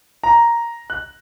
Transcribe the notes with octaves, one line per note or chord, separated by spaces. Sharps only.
A#5
F#6